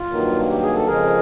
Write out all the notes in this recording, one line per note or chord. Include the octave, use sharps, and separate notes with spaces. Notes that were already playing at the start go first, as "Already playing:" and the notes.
Already playing: F4
G2 D#3 F#3 A#3
G4
G#4
A4
F2 C#3 F3 G#3 G#4 A#4